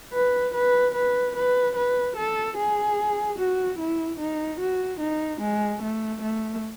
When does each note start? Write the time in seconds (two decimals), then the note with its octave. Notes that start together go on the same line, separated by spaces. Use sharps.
0.13 B4
0.54 B4
0.95 B4
1.36 B4
1.76 B4
2.17 A4
2.57 G#4
3.39 F#4
3.79 E4
4.20 D#4
4.60 F#4
5.00 D#4
5.41 G#3
5.82 A3
6.22 A3